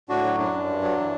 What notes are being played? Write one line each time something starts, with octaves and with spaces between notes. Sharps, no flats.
A2 D4 F#4
F#3
F#2 D4
F#2
G2
F#3
E3